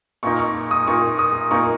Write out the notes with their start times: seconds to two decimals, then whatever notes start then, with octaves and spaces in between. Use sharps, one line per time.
0.23 A#2 A#3 D#4 C#6
0.39 C#6
0.71 D#6
0.87 A#2 A#3 D#4 C#6
1.19 D#6
1.51 A#2 A#3 D#4 C#6